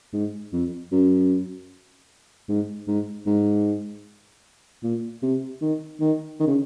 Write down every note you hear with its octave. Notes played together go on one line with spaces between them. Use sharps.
G#2
F2
F#2
G#2
G#2
G#2
A#2
C3
D#3
D#3
D#3
C#3